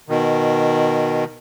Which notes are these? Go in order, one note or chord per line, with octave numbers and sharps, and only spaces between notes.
B2 D#3